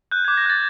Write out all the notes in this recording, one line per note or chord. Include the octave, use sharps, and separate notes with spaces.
F#6 G6
D6 G#6
A#6
F#6 A6